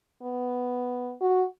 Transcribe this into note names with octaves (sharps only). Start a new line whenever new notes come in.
B3
F#4